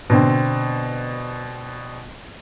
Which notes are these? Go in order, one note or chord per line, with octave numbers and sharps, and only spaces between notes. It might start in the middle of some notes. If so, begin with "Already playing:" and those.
B2 D3 C4